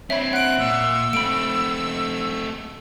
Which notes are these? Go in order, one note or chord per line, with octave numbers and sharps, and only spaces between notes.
C4 D4 C#5 E5 B5
F#5 F#6 D7
A#2 E6
A3 C4 B5 D7